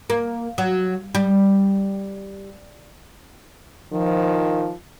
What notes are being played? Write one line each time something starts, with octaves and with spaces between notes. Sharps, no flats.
A#3
F#3
G3
D#3 F3